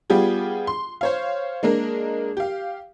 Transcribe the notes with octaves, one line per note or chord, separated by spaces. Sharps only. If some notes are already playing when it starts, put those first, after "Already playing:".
G3 B3 F4 G4 G#4
C6
C5 C#5 F5
G#3 A#3 D4 A#4
G4 F5